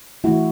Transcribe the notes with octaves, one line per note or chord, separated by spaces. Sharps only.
E3 A3 E4 F#4